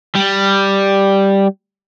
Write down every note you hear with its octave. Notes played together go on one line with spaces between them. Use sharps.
G3